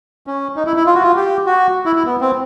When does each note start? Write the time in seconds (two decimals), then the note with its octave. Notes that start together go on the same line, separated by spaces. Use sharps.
0.27 C#4
0.56 D#4
0.66 E4
0.76 E4
0.86 F4
0.95 F#4
1.02 F4
1.16 G4
1.46 F#4
1.86 E4
1.96 E4
2.06 B3
2.21 C4